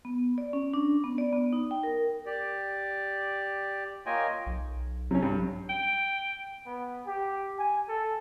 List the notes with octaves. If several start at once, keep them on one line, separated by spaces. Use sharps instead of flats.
B3
D5
C#4
D4
B3
D5
B3
D#4
G5
A#4
G4 D5
A#3 F4 C#5 D#5 G5 G#5
B1
C3 F#3 C#4
G2
G5
B3
G4
G#5
A4